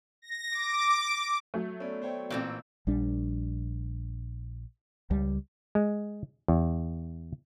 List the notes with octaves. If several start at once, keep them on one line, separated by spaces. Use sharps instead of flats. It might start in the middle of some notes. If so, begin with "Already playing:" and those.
A#6
D6
F#3 A3
B3 C#4 A4 D5
C5 C#5 G5
A1 A#2 E3 C4
A#1 G3 D4
C#2 G3
G#3
E2